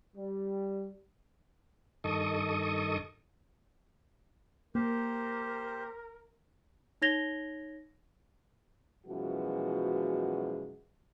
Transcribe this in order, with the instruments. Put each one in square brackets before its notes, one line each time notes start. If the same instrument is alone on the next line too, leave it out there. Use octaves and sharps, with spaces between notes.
[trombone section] G3
[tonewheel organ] G2 D#3 A4 D#5 C#6 D#6
[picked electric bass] A#3 [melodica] G4 C5 [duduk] A#4
[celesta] D#4 C#5 G#6 A#6 F7 G7
[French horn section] F#2 B2 E3 F3 G#3 F#4